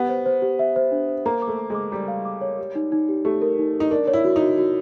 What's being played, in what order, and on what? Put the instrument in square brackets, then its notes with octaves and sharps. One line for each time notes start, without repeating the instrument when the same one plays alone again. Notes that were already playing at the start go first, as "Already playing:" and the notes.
Already playing: [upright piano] B3 [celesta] G4
[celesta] C5
C5
G4
E5
C5
D4
C5
[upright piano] A#3 [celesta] A#5
[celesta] D6
[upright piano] A3
[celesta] A#5
[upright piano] G#3 [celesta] D6
[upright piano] G3 [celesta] A#5
[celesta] F5
D6
C#5
G4
D#4
D#4
G4
[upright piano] A3 [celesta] G4
[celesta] A#4
D#4
A#4
[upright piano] D#4
[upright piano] D4 [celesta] A#4
[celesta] C#5
[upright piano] E4
[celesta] F#4
[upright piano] D#4
[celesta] F#4
F#4